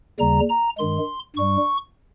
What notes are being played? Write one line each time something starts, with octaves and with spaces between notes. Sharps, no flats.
D#2 C#3 G3 A#5
A#5
G2 D#3 G#3 C6
G2 G3 C#6